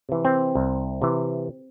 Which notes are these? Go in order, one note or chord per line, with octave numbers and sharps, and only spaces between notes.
C3 E3
C4
C2
C3 E3